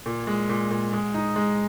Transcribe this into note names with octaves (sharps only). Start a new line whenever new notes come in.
A#2
G#3
A#2
A#2
G#3
D#4
G#3